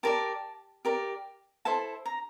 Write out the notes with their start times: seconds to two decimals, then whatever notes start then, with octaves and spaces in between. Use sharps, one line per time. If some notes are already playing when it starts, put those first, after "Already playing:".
0.03 G4 A#4 D5 A5
0.85 G4 A#4 D5
1.65 E4 A4 C5 A5
2.06 A#5